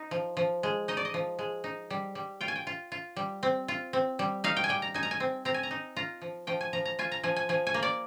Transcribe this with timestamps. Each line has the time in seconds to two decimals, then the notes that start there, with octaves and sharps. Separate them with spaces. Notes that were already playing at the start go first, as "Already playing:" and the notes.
Already playing: D#4
0.11 F3
0.37 F3
0.63 G#3
0.88 D#4 D#5
0.97 D5
1.05 D#5
1.14 F3
1.39 G#3
1.64 D#4
1.90 G3
2.15 G3
2.41 F4 G5
2.48 G#5
2.55 G5
2.67 F4
2.92 F4
3.16 G3
3.43 C4
3.68 F4
3.93 C4
4.19 G3
4.44 D#4 F5
4.57 G5
4.64 G#5
4.69 G3 G5
4.82 A#5
4.94 D#4 G#5
5.03 A#5
5.11 G#5
5.20 C4
5.45 C4 A#5
5.54 G#5
5.63 A#5
5.71 D#4
5.96 F4 A#5
6.22 F3
6.47 F3 G5
6.61 G#5
6.73 F3 A#5
6.85 A#5
6.99 F4 G#5
7.12 A#5
7.23 F3 G#5
7.36 G#5
7.49 F3 G#5
7.67 G#5
7.74 A#3
7.83 D5